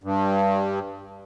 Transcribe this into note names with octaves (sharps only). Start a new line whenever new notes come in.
G2